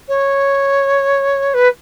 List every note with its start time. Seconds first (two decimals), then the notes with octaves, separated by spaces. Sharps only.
0.08 C#5
1.54 B4